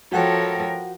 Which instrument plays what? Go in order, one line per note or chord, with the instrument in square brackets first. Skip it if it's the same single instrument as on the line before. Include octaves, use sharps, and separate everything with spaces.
[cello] F3 A#4 [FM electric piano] F#4 F#5 G5 [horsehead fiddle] A4 C#5